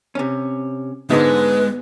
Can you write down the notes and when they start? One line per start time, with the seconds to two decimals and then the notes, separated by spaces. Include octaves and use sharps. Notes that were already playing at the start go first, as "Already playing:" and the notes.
0.15 C3 C#4
1.10 G#2 D3 G#3 B3 D#4 B4